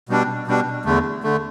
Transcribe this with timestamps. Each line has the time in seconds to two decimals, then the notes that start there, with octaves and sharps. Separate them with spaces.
0.09 B2 G3 D4
0.48 B2 G3 D4
0.85 E2 D3 A3
1.23 D3 A3